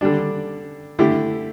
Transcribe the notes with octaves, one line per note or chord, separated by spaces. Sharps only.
D3 G3 D4
D3 A3 E4 G4